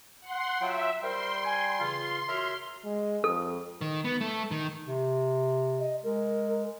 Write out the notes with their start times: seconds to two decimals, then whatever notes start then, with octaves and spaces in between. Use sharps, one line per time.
0.21 F#5 C6
0.61 F#3 F4 E5 G5
1.02 G3 A#4 C5 G5 C6
1.44 G#5
1.79 C#3 E3 F4
2.28 F#4 A#4 C#5 E5 A#5 F6
2.85 G#3
3.24 F2 A4
3.81 D#3
4.04 B3
4.21 A3
4.51 D#3
4.86 C3
5.79 D#5
6.03 G#3 A#4